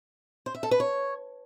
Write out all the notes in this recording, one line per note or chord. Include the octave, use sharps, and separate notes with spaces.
C5
E5
A4
B4
C#5